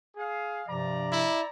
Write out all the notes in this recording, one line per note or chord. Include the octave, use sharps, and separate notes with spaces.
G#4 F5
G2 C3 F3 D5 A#5
E4